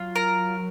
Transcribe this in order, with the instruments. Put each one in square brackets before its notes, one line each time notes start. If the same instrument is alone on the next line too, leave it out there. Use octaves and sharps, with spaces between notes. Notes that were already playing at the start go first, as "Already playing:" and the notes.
Already playing: [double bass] F#3 [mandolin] F4
[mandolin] A#4